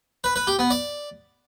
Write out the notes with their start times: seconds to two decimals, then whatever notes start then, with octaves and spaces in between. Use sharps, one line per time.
0.24 B4
0.36 B4
0.47 G4
0.59 B3
0.70 D5